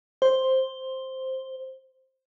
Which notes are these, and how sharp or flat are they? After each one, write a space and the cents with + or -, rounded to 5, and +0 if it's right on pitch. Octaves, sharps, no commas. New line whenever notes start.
C5 +5